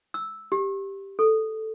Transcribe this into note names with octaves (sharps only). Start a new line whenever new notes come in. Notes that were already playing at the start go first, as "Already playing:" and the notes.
E6
G4
A4